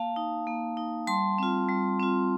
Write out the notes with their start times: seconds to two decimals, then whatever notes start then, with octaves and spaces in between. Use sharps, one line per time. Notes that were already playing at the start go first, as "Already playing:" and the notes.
Already playing: A#3 F5 A5
0.16 D#4
0.47 A#3
0.77 D#4
1.07 G3 A5 C6
1.38 C4 F4
1.69 G3
2.00 C4 F4